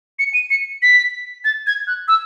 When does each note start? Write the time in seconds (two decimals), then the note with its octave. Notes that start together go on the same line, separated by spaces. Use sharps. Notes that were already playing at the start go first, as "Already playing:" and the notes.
0.19 C#7
0.34 D#7
0.50 C#7
0.82 B6
1.45 A6
1.67 G#6
1.87 F#6
2.08 E6